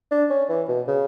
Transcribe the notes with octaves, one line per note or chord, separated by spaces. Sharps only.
D4
C#4
E3
B2
C#3